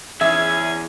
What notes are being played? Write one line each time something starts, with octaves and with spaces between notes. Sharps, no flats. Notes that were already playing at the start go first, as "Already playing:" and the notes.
E2 C#4 G#4 E5 G#6